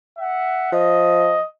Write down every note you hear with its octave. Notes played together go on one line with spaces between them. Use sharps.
E5 F#5
F3 D#5